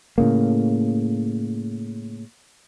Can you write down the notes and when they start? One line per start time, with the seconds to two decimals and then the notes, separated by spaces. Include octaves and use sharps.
0.18 A2 C#3 A#3